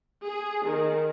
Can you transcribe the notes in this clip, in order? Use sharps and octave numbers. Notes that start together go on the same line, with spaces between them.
G#4
D#3